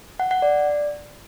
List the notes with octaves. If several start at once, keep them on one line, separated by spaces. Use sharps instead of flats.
F#5
F#5
D5